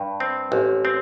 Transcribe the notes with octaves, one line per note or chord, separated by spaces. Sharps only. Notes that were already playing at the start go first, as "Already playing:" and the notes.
Already playing: G2
C4
A1
C4